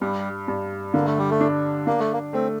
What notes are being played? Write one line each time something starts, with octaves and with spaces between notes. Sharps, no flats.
G2 G3
G2
D3 A#3
A3
G3
A3
D4
A#3 D4
A3
A#3
A3 C4